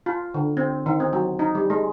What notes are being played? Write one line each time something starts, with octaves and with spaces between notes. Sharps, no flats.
F4
D3
C4
D#3
C4
F#3
D#4
G3
G#3